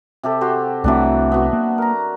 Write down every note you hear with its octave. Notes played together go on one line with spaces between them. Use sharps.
C3 G4 A4
F#4 G4 C5
C2 E3 F#3 A3 C4 D4
B3 F#4
A#3
A#4 A#5